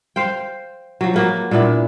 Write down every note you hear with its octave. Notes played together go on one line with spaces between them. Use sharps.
C5 F5 G5
F3 F#3
F#3 A#3 B4
A#2 B3 D4 E4